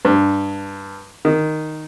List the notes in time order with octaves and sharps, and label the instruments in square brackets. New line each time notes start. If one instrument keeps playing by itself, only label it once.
[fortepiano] G2
D#3